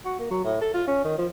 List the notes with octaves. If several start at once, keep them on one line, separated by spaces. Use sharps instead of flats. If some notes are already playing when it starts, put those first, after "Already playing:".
F#4
A#3
F#3
A2
A4
F4
C#4
D#3
F3